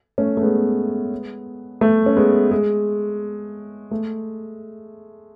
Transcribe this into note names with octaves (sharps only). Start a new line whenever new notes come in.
A3 C#4
A3
G#3 B3
A3
C#4
G#3 B3
G#3
A3